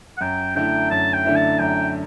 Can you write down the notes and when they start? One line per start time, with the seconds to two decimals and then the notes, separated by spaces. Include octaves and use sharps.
0.17 F#5
0.21 F#2 G5
0.55 D3 A3 E4 G5
0.91 F#2 A5
1.14 G5
1.24 D3 A3 E4
1.36 A5
1.59 F#2 G5